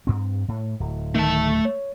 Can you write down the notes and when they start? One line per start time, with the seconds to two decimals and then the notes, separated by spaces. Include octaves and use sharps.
0.07 G2 C4
0.48 A2
0.80 D1
1.15 D#3 A3 A5
1.65 C#5